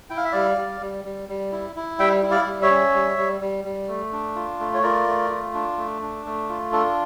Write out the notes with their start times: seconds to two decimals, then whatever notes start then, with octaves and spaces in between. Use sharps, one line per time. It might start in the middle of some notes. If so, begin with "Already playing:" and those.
0.10 E4 G5
0.17 F5
0.25 E5
0.32 G3 D5 F5
0.57 G3
0.81 G3
1.05 G3
1.29 G3
1.52 E4
1.76 E4
1.99 G3 E5 G5
2.23 E4
2.31 D5 F5
2.46 G3
2.62 C#5 E5
2.70 C#4
2.94 G3
3.18 G3
3.41 G3
3.65 G3
3.88 A3
4.12 D4
4.36 F4
4.60 A3
4.74 C#5
4.83 F4 A#4 D5
5.07 A3
5.30 F4
5.54 D4
5.78 A3
6.02 D4
6.26 A3
6.49 F4
6.72 D4 A4